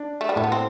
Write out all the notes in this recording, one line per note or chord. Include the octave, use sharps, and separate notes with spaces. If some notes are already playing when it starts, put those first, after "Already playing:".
Already playing: D4
A3
G3
A2 A3
B3
C4